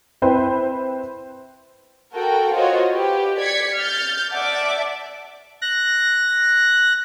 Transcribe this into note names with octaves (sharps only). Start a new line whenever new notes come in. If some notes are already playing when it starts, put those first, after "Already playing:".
C4 E4 B4 C5
F#4 A4 A#4 G5
F4 F#4 C5 C#5 D#5
G4 B4
D5 G#6 B6 C#7
F6 G6 A6
D5 E5 F#5 A5 D6
F#6 A#6